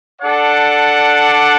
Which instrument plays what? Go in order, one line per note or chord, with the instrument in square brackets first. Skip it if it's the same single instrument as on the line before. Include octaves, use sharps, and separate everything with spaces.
[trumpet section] D4 A4 D5 F#5